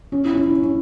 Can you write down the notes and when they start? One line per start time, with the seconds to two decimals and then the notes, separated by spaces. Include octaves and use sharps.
0.12 C#4
0.25 E4
0.33 C#4
0.38 E4
0.50 C#4
0.63 C#4